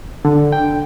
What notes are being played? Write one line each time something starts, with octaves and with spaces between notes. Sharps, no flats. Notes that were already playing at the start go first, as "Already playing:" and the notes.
D3
G5